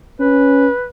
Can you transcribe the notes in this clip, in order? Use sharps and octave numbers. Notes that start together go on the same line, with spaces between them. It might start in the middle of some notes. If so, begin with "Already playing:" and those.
C#4 B4